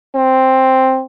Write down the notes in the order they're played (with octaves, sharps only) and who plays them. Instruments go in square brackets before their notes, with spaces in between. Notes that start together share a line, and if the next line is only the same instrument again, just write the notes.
[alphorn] C4